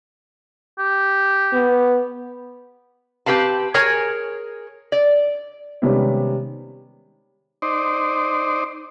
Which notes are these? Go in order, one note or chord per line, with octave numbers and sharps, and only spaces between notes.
G4
B3
C4 G4 B4 F5 A5
G#4 A#4 C#5 G#5
D5
C3 D#3 G3 G#3 B3 C#4
D#4 C5 D5